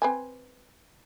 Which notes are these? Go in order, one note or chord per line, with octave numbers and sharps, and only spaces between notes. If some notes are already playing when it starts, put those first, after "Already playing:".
C4 B4 G#5